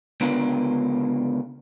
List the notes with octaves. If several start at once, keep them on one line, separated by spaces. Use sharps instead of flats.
C#2 D3 B3 D4 F4 A#4